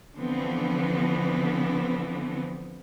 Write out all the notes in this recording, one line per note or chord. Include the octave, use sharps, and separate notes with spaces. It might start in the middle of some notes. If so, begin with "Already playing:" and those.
D3 E3 F3 B3 C4